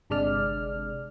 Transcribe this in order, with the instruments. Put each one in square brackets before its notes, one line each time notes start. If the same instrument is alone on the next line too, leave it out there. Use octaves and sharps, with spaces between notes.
[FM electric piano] G1 C3 G#3 D4 D5 F6